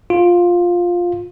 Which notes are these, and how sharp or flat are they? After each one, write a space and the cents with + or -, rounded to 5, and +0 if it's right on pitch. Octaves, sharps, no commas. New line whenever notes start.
F4 +10